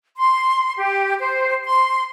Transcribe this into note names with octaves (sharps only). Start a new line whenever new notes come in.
C6
G4
C5
C6